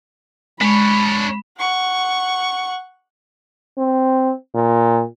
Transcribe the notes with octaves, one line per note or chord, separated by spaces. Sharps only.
G#3 D4 C#5 B5
F#5 C#6
C4
A#2